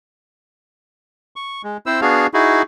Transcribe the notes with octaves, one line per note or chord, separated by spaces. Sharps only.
C#6
G#3
C4 E4 C5 E6
B3 D4 F#4 G#4 F5
D#4 E4 F#4 G#4